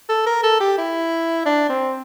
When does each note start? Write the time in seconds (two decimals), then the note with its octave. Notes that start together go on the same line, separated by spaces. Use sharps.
0.09 A4
0.26 A#4
0.43 A4
0.60 G4
0.78 E4
1.46 D4
1.69 C4